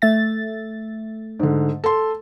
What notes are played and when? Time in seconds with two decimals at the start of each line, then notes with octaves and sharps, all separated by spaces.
0.02 A3 E5 A6
1.40 G#2 D3
1.84 A4 C6